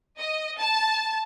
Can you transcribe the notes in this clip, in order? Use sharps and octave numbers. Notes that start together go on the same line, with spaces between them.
D#5
A5